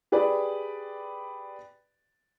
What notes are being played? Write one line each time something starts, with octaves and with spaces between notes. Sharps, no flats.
G4 G#4 B4 D5